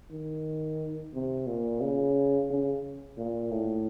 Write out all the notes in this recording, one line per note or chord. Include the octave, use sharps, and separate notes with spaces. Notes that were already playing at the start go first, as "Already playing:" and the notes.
D#3
C3
A#2
C#3
C#3
A#2
A2